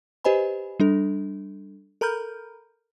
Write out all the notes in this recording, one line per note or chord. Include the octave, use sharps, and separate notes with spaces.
G4 B4 C5 D#5 G#5 B5
G3 D4 A4
A4 A#4 A#5 B5 F6 G6